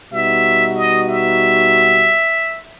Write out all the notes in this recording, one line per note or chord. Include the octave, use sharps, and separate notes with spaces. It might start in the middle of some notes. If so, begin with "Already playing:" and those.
B2 G3 B3 D#4 F#4 E5
D#5
E5